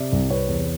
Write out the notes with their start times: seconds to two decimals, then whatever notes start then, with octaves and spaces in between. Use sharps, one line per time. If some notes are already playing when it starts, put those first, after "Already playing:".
Already playing: C3 D5 E5
0.13 C2
0.30 C3 B4 C#5
0.48 E2